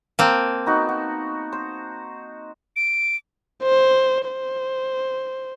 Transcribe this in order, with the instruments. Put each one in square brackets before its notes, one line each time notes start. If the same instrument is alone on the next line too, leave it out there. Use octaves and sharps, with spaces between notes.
[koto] A#3 C4 [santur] A5
[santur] B3 D#4 F#4
F#4
C5
[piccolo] D7
[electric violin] C5
C5